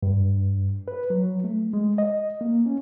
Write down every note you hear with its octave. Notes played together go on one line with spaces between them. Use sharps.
G2
B4
F#3
A3
G#3
D#5
A#3
C#4